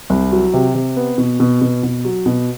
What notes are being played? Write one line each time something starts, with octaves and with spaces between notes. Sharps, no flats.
C2
F#3
C3
C3
B3
B2
B2
B2
B2
F#3
B2